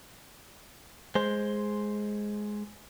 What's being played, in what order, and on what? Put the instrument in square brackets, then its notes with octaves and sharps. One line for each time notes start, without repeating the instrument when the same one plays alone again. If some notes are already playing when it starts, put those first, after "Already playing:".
[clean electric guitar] G#3 C5